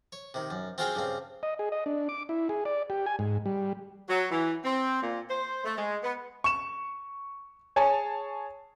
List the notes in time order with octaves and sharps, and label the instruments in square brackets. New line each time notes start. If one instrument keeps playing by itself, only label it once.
[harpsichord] C#5
C3 D#3
F#2
C4 F4 F#4 G#4 F5 G5
G2 C#3 C4
[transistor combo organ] D#5
G#4
D#5
D4
D6
E4
G#4
D5
G4
G#5
G#2
G3
[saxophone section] F#3
E3
C4
A#2
C5
A3
G#3
B3
[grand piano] C#6 E7
G#4 C#5 G#5 A5